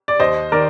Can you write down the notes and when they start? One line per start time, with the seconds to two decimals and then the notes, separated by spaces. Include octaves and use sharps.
0.08 D5
0.20 D#2 C5 D#5
0.52 D#3 A#4 D5